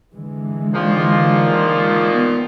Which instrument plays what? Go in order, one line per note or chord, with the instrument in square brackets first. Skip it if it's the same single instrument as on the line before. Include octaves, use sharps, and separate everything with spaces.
[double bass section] D3 E3 G#3
[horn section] A#2 D#3 F3
[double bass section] B3